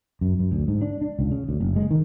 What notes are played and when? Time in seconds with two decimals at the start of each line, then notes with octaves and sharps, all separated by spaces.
0.21 F#2
0.39 F#2
0.52 D2
0.68 G#2
0.81 D4
1.01 D4
1.19 C#2
1.31 C#3
1.49 D2
1.61 F#1
1.76 G#3
1.91 D#3